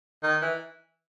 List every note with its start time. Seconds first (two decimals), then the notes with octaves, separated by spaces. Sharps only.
0.23 D#3
0.42 E3